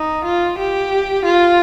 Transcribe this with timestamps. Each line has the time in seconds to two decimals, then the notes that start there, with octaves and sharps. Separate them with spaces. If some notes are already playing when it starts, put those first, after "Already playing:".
Already playing: D#4
0.25 F4
0.58 G4
1.25 F4